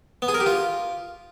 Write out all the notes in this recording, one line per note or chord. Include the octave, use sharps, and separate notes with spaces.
B3
G#4
A#4
G4
F4